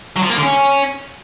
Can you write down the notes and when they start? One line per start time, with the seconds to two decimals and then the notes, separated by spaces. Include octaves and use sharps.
0.16 F#3
0.23 F3
0.29 A#3
0.36 D3
0.43 C#4